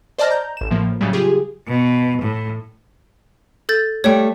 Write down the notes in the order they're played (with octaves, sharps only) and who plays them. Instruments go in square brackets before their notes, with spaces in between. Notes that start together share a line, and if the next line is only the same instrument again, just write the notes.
[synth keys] C5 D5 D#5 A5 F6 A#6
A#5 G6
A1 E7
A2 F3 A#3
A2 C#3 F#3 G3
F4 G4 G#4
[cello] B2
A2
[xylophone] A4 G6 A6
[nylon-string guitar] G3 A3 [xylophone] C#5 G5